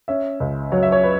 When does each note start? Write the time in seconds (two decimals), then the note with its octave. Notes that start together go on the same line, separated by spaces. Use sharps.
0.08 C#4 E5
0.40 C#2
0.72 F#3 C#5
0.83 E5
0.92 C#5
1.03 B4